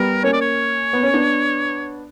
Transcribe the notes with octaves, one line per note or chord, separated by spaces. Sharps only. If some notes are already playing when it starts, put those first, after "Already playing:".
Already playing: G3 B3 A#4
A#3 C#4 C#5
D5
C#5
B3
C#4
B3 D4